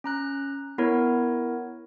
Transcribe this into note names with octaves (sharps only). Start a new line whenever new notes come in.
C#4 A#5 F#6
B3 E4 A#4 C#5